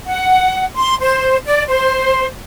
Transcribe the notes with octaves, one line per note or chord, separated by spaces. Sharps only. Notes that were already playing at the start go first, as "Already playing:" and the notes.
F#5
C6
C5
D5
C5